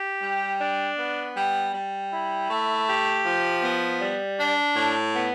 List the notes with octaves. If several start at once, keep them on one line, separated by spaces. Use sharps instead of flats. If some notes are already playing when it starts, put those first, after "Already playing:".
Already playing: G4
G3
D4
B3
G3
G3
E4
A3
G4
F3
B3
G3
D4
A2
B3